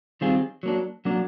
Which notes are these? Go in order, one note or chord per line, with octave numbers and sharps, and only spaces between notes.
D#3 G3 C4 F4 G#4
F#3 A#3 D4
F#3 A#3 D4